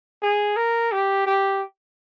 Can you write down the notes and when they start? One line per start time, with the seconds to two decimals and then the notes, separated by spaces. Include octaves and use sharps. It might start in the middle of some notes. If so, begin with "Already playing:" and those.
0.22 G#4
0.56 A#4
0.92 G4
1.26 G4